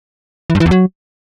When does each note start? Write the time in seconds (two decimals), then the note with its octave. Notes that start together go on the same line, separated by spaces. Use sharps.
0.50 E3
0.55 G2
0.60 E3
0.66 E2
0.71 F#3